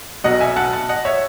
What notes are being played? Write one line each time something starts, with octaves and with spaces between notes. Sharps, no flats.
B1 B2 F#3 D#5 F#5
E5 G#5
F#5 A5
F#5 A5
D#5 F#5
C#5 E5